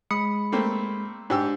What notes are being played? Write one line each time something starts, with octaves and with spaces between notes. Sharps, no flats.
G#3 B5 D#6 C#7
A3 A#3 C4
G#2 D4 G4 E6